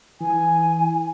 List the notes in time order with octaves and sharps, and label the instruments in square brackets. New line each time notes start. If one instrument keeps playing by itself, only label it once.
[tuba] E3 [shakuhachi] G#5